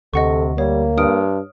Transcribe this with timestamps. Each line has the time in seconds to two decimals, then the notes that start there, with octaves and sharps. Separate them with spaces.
0.13 D2 C3 A4 D#5 F#5 C#6
0.58 G3 A#3 C#5
0.98 G2 D#6 F6 D7